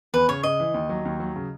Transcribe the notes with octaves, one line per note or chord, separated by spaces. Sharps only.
E2 B4
C#3 C#5
C#3 D#5
E3
D#2
F#3
D#2
F#3
C#3